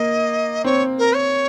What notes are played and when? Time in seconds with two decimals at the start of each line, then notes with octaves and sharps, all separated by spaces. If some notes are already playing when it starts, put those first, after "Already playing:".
Already playing: A#3 D#5
0.64 C4 C#5
0.98 A#4
1.15 C#5